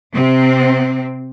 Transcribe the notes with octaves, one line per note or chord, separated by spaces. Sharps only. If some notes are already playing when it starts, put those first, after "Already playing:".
C3 C4